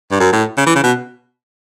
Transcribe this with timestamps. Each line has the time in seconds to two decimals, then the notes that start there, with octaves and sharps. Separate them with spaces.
0.11 G2
0.20 F#2
0.32 A2
0.57 C#3
0.66 E3
0.75 C#3
0.83 B2